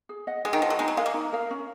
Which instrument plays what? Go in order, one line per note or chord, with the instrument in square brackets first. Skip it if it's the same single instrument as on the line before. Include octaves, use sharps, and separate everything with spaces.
[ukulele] G#4
D#5 F#5
[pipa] G#3 [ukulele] G#4
[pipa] D#3
[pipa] F3 [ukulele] D#5 F#5
[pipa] F#3
[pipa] G#3 [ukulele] D#4
[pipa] F#3
[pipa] G#3 [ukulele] A#4 F5
[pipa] A#3
[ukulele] D#4
A#4 F5
C#4